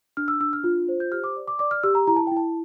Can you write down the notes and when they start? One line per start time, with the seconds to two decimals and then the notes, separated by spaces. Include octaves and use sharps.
0.17 D4 F6
0.28 E6
0.40 D4 E6
0.53 F6
0.64 F4
0.88 C5
1.00 G6
1.12 G4 F6
1.24 D6
1.36 D5
1.48 D6
1.59 D5 D6
1.71 F6
1.83 G4 E6
1.95 A#5
2.07 E4 A#5
2.16 A5
2.27 E4 G5
2.37 A5